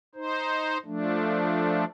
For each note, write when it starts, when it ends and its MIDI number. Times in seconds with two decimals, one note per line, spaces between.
0.15 0.78 63
0.15 0.78 72
0.85 1.85 53
0.85 1.85 57
0.85 1.85 62